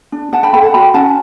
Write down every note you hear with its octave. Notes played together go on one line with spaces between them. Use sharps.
D4
D4 F#5 A5
G5 B5
A4 G5 B5
F#5 A5
F#4 G5 B5
C#4 F#5 A5